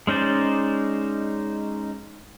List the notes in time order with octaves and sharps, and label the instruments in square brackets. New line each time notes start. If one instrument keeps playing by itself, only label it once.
[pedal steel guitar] G#3 C#4 D#4 C5 D5